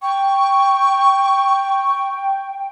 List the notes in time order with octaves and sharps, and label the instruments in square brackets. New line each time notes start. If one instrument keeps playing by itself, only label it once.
[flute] G5 [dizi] C#6